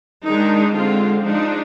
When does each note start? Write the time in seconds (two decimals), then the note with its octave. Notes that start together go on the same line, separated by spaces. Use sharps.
0.25 D#3 G#3 D4 D#4
0.74 D3 G#3 C4 F4
1.24 F3 G#3 D4 D#4